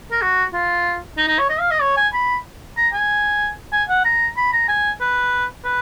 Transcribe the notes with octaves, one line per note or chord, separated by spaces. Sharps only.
A#4
F#4
F4
D#4
D#4
C#5
D#5
F5
D#5
C#5
G#5
B5
A#5
G#5
G#5
F#5
A#5
B5
A#5
G#5
B4
B4